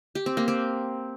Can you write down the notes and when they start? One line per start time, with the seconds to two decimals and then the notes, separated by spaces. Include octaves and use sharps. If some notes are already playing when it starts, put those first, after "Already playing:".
0.15 G4
0.26 C4
0.37 A#3
0.48 C4